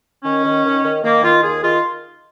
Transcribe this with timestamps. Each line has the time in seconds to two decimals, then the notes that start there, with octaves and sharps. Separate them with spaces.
0.24 D#3 C#4
0.44 D#3
0.65 D#3
0.83 D#3
1.03 D#3 A#3
1.23 D#3 F4
1.43 D#2 G#4
1.63 D#3 F4